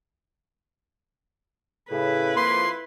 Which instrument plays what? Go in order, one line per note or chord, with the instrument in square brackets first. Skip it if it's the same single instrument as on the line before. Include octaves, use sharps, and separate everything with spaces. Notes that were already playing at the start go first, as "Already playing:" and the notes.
[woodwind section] A2 C#3 [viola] E4 B4
[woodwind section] F2 F3 A#3 [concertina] C6